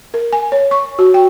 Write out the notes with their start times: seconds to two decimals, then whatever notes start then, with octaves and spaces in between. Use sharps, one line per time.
0.14 A#4
0.33 G#5
0.52 C#5
0.71 C#6
0.99 F#4
1.14 G5